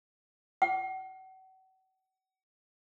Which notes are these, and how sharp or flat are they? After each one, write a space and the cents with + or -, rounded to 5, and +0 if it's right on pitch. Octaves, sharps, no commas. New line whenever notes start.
F#5 +40